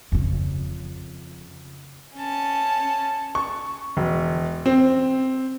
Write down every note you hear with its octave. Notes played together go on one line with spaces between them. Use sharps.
F2 C#3
C#4 A5
C#6
E1
C4